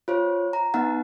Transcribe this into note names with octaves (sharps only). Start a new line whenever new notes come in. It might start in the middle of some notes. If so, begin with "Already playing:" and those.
F4 C5 C#5
A#5
B3 D#4 F#5